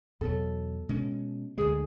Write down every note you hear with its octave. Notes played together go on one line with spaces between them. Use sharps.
E2 B2 F#3 A4
B2 G#3 C#4
D2 D3 G#3 G#4